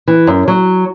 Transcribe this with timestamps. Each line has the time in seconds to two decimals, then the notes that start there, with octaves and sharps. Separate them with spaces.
0.08 E3
0.27 F#2
0.48 F#3